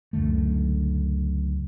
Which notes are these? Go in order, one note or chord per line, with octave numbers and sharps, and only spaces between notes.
C#2 F#2 D3 A3